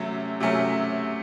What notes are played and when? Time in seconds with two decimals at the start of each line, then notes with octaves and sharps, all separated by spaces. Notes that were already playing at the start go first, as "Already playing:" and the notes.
Already playing: C3 F#3 A3 C#4
0.40 C3 F#3 A3 C#4